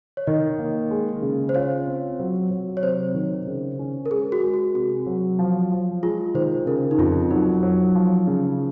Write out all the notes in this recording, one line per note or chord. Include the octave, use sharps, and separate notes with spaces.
C#5
D#3 D#5
A#3
G#3
C#3
C5
F4 C#5
C4
F#3
F#3
C#5
C3 C5
D#3
C#3
C#4
A#4
G#3 G#4
F#4
G#3
F#4
C3 F#4
F#3
F3
F3
G#3 F4
D#3 C5
C#3 A#4
D#4
F2 F4
F#3 D#4
F#3
F3
C#3